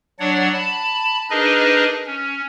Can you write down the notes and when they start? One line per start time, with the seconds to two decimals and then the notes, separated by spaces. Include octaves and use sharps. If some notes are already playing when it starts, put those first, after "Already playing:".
0.20 F#3 D4 C#5 D5 F#5
0.54 A5 B5
1.30 D4 D#4 G#4 A#4 B4 D#5
2.06 C#4